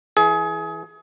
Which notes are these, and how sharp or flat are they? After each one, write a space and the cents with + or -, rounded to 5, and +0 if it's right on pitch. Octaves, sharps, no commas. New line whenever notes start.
E3 +0 G#4 +25